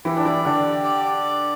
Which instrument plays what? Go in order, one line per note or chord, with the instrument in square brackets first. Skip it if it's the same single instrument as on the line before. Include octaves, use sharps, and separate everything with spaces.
[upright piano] E3 E4 [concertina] G4
[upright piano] D4
[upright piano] E3 E4 [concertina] D5
[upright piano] D3 D4 [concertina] G4
[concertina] G4
D5
D5